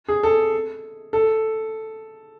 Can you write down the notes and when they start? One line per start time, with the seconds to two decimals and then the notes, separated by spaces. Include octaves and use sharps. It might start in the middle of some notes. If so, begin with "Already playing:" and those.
0.08 G#4
0.23 A4
1.13 A4